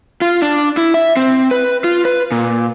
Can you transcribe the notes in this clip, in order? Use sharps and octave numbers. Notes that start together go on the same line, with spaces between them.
F4
D4
E4
E5
C4
B4
F4
B4
A#2